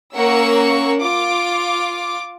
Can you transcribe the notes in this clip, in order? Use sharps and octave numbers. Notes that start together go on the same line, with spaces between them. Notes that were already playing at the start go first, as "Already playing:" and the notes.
A#3 C#4 A#4 F#5 C#6 E6
F4 D6